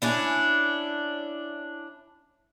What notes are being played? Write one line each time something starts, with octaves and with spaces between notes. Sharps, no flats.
C#4 D4 E4